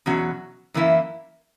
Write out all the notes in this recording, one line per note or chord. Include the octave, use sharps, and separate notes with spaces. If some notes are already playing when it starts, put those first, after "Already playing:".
E2 B2 F#3 C#4 F#4
F#2 E3 A#3 E4